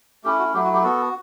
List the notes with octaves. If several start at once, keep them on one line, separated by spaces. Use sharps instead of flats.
A3 C#4 E4 G4
F#4
F#3 A3 E4 G4
F#4
G4
B3 F#4 A4